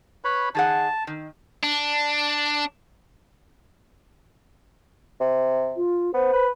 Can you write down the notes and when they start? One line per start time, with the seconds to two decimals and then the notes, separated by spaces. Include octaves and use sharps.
0.24 B4 C#5 B5
0.55 D#3 G#4 F#5 A5
1.07 D#3
1.63 D4
5.20 C3
5.76 F4
6.14 B3 C5
6.33 B4